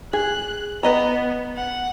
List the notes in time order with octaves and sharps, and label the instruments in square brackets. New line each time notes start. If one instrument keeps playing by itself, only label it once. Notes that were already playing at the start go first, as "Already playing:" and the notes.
[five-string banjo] G#4 [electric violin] F#6
[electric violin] B3 [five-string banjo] B4 D#5 A#5
[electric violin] F#5